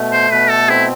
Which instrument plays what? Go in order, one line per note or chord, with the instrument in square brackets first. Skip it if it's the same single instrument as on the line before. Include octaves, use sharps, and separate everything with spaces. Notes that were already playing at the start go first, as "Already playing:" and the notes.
Already playing: [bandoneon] B2 A3
[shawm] C5
[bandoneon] B2 [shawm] B4
[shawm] A4
[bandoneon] C4 [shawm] E4